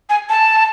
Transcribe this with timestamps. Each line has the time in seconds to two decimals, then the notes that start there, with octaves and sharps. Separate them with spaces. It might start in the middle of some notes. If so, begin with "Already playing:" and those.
0.10 G#5
0.29 A5